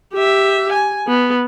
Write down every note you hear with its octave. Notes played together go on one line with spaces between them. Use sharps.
G4 E5
G#5
B3